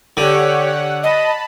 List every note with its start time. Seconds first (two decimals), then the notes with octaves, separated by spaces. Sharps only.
0.17 D3 G4 C#5 F#5
0.67 F#5
1.03 D#5 A5 B5